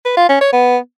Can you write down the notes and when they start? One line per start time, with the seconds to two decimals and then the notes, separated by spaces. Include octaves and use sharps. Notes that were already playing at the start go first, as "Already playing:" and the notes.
0.05 B4
0.17 F4
0.29 C#4
0.41 C#5
0.53 B3